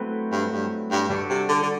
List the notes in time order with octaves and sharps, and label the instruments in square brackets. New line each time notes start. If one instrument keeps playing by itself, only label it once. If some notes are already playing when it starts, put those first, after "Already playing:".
Already playing: [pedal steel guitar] F#3 A3 C4 E4 B4
[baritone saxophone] G2
G2
G2
[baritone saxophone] G2 [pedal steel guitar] G3 D4 F#4 A4
[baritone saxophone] C3
D3
D3